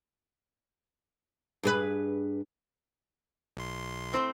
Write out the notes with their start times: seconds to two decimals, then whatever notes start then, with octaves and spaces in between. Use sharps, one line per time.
1.63 G2 G#4 B4
3.57 B1 C6
4.13 A2 C4 C5